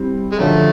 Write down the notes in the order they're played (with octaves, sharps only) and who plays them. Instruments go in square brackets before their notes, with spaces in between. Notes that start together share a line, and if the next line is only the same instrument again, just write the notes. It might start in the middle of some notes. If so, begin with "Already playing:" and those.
Already playing: [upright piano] G3 C4 E4
[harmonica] G#3
[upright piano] F#2 D3 F3 [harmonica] A3